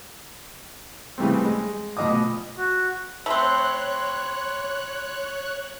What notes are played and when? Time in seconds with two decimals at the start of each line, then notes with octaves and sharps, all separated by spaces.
1.18 C#3 E3 G3 A3 C4
1.45 G#3
1.97 D2 B2 F3 D#5 D6 D#6
2.57 F#4
3.26 A3 C4 C#5 B5 C6 F#6